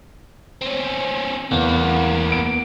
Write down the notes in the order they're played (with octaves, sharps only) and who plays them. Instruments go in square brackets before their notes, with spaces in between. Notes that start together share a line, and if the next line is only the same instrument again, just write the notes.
[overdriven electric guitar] C4 C#4
[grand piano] E2 [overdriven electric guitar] A#3 B3
[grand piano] D7